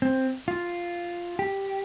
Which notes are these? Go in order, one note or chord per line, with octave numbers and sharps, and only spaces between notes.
C4
F4
G4